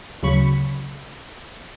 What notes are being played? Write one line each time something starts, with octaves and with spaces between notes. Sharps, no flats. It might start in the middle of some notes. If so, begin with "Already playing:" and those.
D2 C#3 F#3 B5 C#6